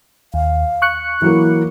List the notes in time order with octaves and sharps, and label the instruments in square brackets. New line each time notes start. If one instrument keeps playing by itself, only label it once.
[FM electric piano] D#2 [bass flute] F5
[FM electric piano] C#6 F#6 C#7
[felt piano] E3 F#3 A#3 [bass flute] E4